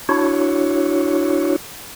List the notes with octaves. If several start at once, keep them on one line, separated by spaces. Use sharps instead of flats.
D4 E4 F#4 C#5